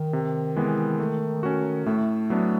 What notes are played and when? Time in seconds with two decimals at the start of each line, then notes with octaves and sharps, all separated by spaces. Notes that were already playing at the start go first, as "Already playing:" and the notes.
Already playing: D#3
0.13 C3
0.56 E3 G#3 B3
1.00 A3
1.43 C#4 F#4
1.86 A2 A3
2.30 F#3 B3 D4